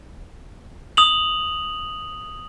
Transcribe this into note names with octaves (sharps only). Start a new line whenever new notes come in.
D#6 F7 F#7